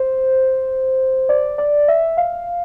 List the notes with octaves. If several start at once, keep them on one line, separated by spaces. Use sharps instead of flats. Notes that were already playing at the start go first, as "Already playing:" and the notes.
Already playing: C5
D5
D5
E5
F5